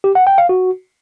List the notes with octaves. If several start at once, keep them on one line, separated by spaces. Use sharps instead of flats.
G4
F#5
G5
F5
F#4